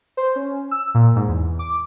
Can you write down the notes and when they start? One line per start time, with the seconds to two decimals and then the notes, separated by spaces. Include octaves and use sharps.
0.17 C5
0.36 C#4
0.71 E6
0.95 A#2
1.16 G#2
1.28 E2
1.59 D6